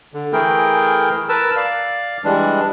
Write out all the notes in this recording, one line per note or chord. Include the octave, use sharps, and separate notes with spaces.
D3
E3 A3 E4 G#4 A#4 G5
A#4 B4 A5 E6
D5 F5
E3 G3 G#3 D4